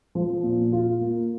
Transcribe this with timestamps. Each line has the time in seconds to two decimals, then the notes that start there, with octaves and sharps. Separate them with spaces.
0.15 F3
0.43 A#2
0.72 F4
1.01 A#3